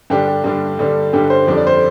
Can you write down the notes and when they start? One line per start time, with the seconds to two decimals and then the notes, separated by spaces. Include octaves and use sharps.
0.10 G2 D3 G3 D4 G4
0.27 G4
0.44 G2 D3 G3 D4
0.79 G2 D3 G3 D4
1.13 G2 D3 G3 D4 G4
1.30 C5
1.47 F2 D3 G3 D4
1.57 D5
1.67 C5